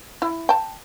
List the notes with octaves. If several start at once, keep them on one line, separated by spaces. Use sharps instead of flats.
E4
G5 A5